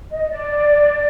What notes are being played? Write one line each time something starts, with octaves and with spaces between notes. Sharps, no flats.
D#5
D5